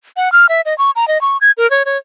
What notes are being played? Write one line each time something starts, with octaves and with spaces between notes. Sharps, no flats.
F#5
F6
E5
D#5
C#6
A#5
D#5
C#6
G#6
A#4
C#5
C#5